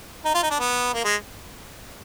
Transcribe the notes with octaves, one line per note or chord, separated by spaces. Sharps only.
D#4
F4
D#4
D4
B3
A#3
G#3